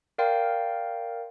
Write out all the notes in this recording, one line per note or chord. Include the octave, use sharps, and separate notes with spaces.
A#4 D5 F5 G5 C6